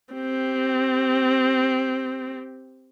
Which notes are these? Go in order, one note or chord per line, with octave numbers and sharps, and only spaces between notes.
C4 G4